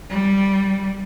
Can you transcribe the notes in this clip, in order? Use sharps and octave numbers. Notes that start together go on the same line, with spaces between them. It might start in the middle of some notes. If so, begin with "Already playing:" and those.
G3